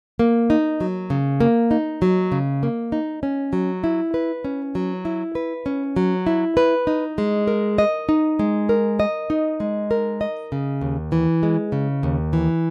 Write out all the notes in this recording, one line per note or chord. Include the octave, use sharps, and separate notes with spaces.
A#3
D#4
F#3
C#3
A#3
D#4
F#3
C#3
A#3
D#4
C#4
F#3
E4
B4
C#4
F#3
E4
B4
C#4
F#3
E4
B4
D#4
G#3
A#4
D#5
D#4
G#3
A#4
D#5
D#4
G#3
A#4
D#5
C#3
D#2
E3
G#3
C#3
D#2
E3